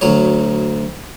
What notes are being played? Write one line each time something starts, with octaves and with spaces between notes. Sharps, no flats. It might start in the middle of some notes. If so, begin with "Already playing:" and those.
D2 F#3 C#5